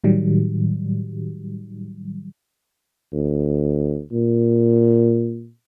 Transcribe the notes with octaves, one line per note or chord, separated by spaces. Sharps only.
A2 D#3 F#3 G3
D2
A#2